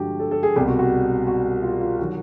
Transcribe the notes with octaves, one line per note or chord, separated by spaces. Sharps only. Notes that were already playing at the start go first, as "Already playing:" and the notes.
Already playing: G2 D3 F3 G#3 F#4 G4
A4
A4
G#4
C2 B2 G3 G4
F#4
F#4
F#4
F4
F4
D#3 F#3 F#4